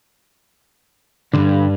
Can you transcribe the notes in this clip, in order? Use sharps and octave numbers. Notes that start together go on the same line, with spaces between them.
C2 G2 D3